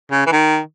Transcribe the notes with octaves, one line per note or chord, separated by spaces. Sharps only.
C#3
E3
D#3